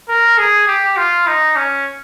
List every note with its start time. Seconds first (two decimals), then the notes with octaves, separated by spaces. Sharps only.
0.09 A#4
0.38 G#4
0.67 G4
0.97 F4
1.27 D#4
1.56 C#4